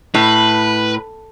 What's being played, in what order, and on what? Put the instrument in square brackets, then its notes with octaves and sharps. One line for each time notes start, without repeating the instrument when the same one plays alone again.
[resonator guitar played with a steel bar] A2 [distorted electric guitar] B4